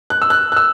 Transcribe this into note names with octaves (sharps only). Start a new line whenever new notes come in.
F#6
E6
F#6
F#6
E6